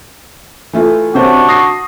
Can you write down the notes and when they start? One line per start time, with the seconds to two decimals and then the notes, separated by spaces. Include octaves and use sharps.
0.73 E3 A3 F4
1.15 C3 C#4 D4 F#4 C5
1.49 D#6 A#6 C7